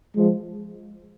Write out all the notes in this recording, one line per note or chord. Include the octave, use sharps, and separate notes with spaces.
F3 G#3